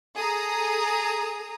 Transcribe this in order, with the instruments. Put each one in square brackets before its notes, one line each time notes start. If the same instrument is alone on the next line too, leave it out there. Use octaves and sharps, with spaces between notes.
[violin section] G#4 A4 A#5 D#6